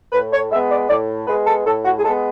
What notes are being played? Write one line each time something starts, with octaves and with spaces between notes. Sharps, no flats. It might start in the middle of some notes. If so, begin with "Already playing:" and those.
A2 B4
C#5
G#3 B3 E5
D5
A2 D5
G#3 B3 B4
A4
A2 A4
F#4
G#4
G#3 B3 A4